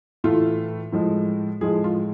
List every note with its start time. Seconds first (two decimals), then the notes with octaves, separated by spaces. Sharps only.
0.24 A2 E3 A3 F4
0.92 A2 F3 G#3
1.61 A2 F3 G#3 G#4
1.84 F4